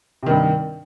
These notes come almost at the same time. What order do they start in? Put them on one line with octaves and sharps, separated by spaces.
C3 D#3 G2